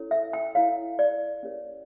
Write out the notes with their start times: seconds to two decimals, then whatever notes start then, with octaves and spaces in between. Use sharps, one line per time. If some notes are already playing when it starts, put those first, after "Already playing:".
Already playing: C#4 E4 A4 C#5
0.11 E5
0.33 G5
0.55 E4 A4 C#5 F5
0.99 D5
1.43 C#4 G4 A#4 C#5